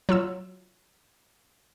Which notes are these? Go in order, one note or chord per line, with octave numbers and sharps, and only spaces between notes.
F#3 F4 E6